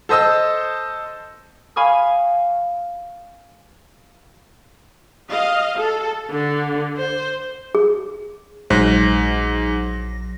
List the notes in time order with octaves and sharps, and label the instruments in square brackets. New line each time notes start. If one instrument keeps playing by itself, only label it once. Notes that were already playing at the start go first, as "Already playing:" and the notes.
[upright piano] A4 C5 D#5 D#6 E6
[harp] F5 G#5 B5 C#6 D#6 F6
[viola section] D#5 F5
A4
[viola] D3
C5
[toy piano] G#4
[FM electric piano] A#1 F#3 A#6 [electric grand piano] G#2 [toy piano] C5